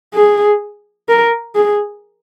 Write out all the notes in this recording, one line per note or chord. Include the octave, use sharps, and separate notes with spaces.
G#4
A#4
G#4